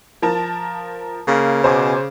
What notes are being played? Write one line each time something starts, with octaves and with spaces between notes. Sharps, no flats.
F3 A#4 A5
C#3 A#3
B2 C5 G#5 D6